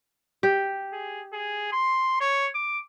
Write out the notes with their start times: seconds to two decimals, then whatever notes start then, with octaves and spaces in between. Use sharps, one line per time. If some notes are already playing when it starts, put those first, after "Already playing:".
0.43 G4
0.93 G#4
1.33 G#4
1.72 C6
2.21 C#5
2.55 D6